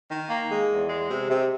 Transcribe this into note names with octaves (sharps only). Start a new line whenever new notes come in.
D#3
A#3
G#3
E2
G#3
C3
C3